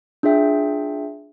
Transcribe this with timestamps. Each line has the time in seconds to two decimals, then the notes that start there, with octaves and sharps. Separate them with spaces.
0.23 D4 F4 G#4 E5 G5